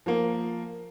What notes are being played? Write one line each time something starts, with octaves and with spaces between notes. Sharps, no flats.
F3 A#3